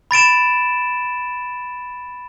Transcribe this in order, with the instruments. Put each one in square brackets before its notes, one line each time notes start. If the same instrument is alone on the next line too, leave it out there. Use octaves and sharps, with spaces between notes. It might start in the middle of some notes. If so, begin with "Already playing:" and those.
[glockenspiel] B5 A6 D7 E7